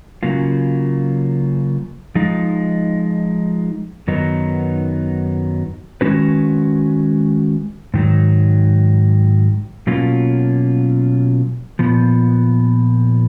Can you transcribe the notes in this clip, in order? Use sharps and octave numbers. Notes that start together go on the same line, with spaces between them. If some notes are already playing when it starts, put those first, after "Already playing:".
C#3 F#3 A#3 F4
F3 G#3 D#4
F#2 D#3 F#3 B3 D#4
D#3 G#3 C#4 F#4 B4
G#2 D#3 F#3
B2 F#3 A#3 C#4 F4
A#2 F3 B3